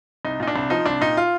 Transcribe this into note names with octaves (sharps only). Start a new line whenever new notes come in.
C2 D#4
A#2 D#4
D4
C2
F3 D#4
C2 D4
A#2 D#4
F4